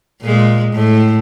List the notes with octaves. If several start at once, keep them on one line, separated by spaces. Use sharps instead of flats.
A#2 G#3
A2